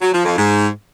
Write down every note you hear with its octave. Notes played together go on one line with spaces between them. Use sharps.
F#3
F3
F2
G#2